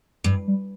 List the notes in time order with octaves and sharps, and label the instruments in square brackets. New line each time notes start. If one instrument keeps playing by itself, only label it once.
[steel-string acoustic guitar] G2 [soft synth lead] G3
[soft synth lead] G3